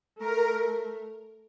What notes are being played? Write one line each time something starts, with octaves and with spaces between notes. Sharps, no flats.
A3 A#4